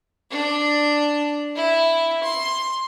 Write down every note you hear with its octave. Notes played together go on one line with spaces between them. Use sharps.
D4
E4
C6